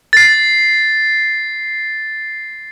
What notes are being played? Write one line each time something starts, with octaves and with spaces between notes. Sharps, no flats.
A6 C7